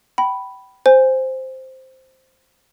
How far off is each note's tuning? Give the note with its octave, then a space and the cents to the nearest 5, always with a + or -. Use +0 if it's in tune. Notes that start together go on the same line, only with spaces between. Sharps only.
G5 -30 B5 +0
C5 +0 G#5 -20